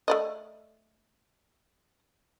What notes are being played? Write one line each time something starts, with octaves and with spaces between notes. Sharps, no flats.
A3 D5 D#5